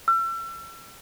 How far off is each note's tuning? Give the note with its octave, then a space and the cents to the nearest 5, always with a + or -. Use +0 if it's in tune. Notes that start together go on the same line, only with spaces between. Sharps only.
E6 +40